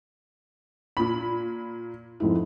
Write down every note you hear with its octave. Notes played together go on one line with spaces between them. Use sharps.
A#2 B5
F2 G#2 E4